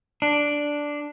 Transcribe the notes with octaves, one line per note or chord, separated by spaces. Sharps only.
D4